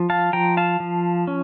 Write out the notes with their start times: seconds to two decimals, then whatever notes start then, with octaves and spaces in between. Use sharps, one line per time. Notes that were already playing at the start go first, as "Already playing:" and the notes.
Already playing: F3
0.10 F5 A5
0.33 F3 G5 A#5
0.57 F5 A5
0.80 F3
1.27 C#4